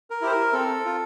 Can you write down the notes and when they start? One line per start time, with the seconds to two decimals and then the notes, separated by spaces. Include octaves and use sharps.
0.10 A#4
0.21 E4 G4 C5
0.31 A#4
0.53 C4 A4
0.85 F4